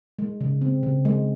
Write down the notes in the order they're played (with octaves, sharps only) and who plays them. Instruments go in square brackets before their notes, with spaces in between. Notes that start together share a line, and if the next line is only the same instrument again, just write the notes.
[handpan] G#3
C#3
C4
C#3
G#3